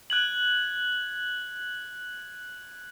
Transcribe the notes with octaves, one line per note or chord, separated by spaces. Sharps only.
F#6 G#6 F#7